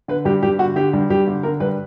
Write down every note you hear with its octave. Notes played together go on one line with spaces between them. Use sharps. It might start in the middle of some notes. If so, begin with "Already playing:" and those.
D3 B4
G2 G4
G2 G4
D3 F#4
D3 G4
G2
G2 G4
D3
D3 A#4
G2 B4